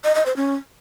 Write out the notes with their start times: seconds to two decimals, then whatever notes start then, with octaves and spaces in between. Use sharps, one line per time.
0.04 D#5
0.15 D#5
0.26 C5
0.37 C#4